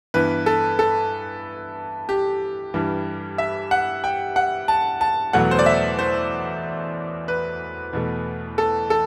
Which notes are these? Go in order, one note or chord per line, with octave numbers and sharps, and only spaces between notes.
G2 E3 B3 B4
A4
A4
G4
G2 E3 G3
E5
F#5
G5
F#5
A5
A5
E2 B2 F#3 A3 F#5
C5
D5
E5
C5
B4
E2 B2 A3
A4
A4